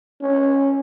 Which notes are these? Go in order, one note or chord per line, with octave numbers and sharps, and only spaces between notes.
C#4